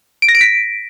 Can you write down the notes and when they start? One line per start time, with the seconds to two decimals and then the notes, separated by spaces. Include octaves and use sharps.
0.22 D7
0.29 A#6
0.35 D7
0.41 B6